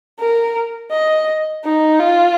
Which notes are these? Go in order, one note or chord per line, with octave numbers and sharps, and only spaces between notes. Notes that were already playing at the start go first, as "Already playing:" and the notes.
A#4
D#5
D#4
F4